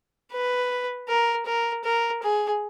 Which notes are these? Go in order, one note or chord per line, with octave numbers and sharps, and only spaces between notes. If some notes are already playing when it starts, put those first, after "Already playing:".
B4
A#4
A#4
A#4
G#4